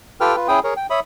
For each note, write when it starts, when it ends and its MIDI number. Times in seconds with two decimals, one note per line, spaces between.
0.21 0.36 65
0.21 0.36 67
0.21 0.36 69
0.21 0.36 71
0.21 0.36 79
0.21 0.36 89
0.36 0.48 65
0.36 0.48 71
0.48 0.60 61
0.48 0.60 64
0.48 0.60 68
0.48 0.60 79
0.48 0.60 87
0.64 0.74 68
0.64 0.74 70
0.64 0.74 73
0.77 0.87 79
0.90 1.00 73
0.90 1.00 76
0.90 1.00 83
0.90 1.00 87